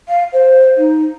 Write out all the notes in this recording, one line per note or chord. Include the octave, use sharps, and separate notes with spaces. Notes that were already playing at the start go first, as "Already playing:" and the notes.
F5
C5
D#4